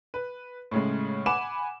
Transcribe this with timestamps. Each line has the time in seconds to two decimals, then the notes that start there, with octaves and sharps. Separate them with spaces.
0.14 B4
0.71 A2 C#3 G#3
1.26 F#5 G#5 B5 D6 E7